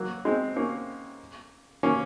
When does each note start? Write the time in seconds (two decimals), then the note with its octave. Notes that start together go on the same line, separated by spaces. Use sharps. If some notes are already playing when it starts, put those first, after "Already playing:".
Already playing: F#3 A#3
0.25 G#3 C4
0.56 A#3 C#4
1.83 A#3 C#4